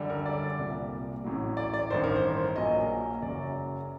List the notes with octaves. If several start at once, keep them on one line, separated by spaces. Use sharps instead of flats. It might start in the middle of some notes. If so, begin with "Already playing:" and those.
Already playing: F#2 D3 G3
A#4
D5
C2 A#2 G3
A1 A2 F#3
D5
D5
A1 G2 D#3 C5
A#4
C5
A#1 A#2 F#3 D#5
F#1 F#2 F#3 D5